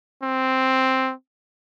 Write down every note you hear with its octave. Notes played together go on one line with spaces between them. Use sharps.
C4